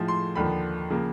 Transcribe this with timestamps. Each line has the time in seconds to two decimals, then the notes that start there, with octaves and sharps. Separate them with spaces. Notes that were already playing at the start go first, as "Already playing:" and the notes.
Already playing: A2 F3 G#3
0.08 C6
0.36 D#2 D3 F3 B5
0.90 C#3 F3 A#3